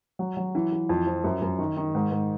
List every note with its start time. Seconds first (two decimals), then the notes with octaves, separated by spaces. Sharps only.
0.19 F#3
0.37 F#3
0.55 E3
0.72 E3
0.89 F2
1.07 F3
1.24 F#2
1.42 F#2
1.59 D#3
1.77 D#3
1.95 G#2
2.11 G#2